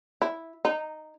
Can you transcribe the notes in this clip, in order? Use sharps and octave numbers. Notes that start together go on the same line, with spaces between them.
E4
D#4